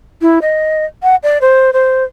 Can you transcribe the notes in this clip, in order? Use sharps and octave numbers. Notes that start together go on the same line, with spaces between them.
E4
D#5
F#5
D5
C5
C5